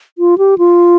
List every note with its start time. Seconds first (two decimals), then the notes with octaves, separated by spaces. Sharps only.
0.18 F4
0.38 G4
0.58 F4